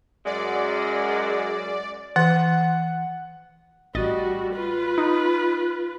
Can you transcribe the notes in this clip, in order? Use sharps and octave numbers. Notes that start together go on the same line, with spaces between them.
F#2 G#3 D5
E3 F#5
A1 G3 F#4 D#5 A6
F4 B4
D#4